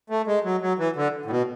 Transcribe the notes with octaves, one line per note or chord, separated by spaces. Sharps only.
A3
G#3
F#3
F#3
E3
D3
A2
B2